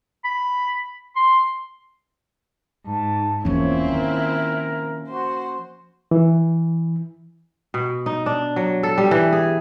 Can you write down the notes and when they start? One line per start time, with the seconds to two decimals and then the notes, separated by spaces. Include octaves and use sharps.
0.24 B5
1.16 C6
2.87 G#2 A5
3.45 E1 E2 F3 A#3 C4 C#4 E4 C#5
3.88 D#3 A#4
5.10 F#4 C5
6.11 E3
7.74 B2
8.06 D#4
8.26 D4
8.56 F#3
8.83 A4
8.98 G3
9.11 E3
9.32 G#4